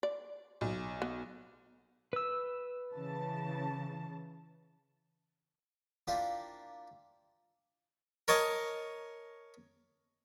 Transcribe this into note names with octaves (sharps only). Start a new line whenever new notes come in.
D5
B1
B3
B4 E6
C#3 E3 A5
A#3 D4 E4 F4 G4 C5
A#4 C#5 D#5 A5